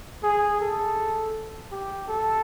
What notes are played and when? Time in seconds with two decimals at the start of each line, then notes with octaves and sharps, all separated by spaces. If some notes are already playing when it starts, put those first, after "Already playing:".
0.23 G#4
0.61 A4
1.72 G4
2.08 A4